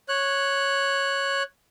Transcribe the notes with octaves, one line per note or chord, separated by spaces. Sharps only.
C#5 F#6